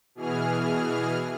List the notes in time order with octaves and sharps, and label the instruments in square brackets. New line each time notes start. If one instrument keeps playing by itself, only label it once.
[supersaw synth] B2 E3 G#4 F6